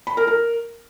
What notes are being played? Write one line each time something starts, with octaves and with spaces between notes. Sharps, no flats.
B5
A#4
A#4